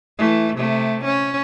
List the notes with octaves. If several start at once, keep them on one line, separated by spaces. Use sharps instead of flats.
E3 A3
C3 A3
C#4